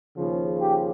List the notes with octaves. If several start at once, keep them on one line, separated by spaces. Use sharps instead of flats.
D#2 C#3 F3
G4